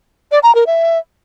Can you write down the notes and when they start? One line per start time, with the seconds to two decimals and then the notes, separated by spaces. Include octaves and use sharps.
0.32 D5
0.43 A#5
0.55 A#4
0.67 E5